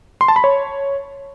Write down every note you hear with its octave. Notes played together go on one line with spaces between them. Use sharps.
C6
A5
B5
C#5